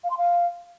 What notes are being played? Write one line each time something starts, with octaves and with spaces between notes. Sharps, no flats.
F5
C6
F5